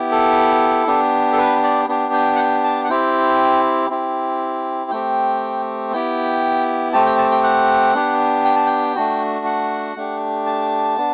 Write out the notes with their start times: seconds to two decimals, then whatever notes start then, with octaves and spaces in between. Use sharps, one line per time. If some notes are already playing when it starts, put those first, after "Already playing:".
Already playing: B3 E4 G4
0.11 A4
0.87 B3 D4 G4
1.33 A4
1.38 B4
1.63 D5
1.88 B3 D4 G4
2.13 G5
2.35 F#5
2.39 G5
2.64 A5
2.84 F#5
2.89 C4 E4 G4 G5
3.90 C4 E4 G4
4.91 A3 C4 G4 G5
5.92 B3 E4 G4 G5
6.93 A3 C4 G4 A5
7.06 G5
7.18 A5
7.31 G5
7.43 F#5
7.95 B3 D4 G4
8.45 G5
8.56 A5
8.66 G5
8.96 A3 D4 F#4
9.46 F#5
9.96 A3 D4 G4
10.46 A5
10.97 B3 D4